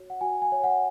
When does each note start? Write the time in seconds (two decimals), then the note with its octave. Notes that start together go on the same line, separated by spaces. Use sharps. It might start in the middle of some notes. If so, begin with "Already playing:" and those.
Already playing: F#4 C#5
0.10 F#5
0.21 F#4 G#5
0.42 G#5
0.52 C#5
0.64 F#5